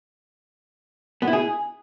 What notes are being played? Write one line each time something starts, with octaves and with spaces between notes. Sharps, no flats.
B3
E4
G#4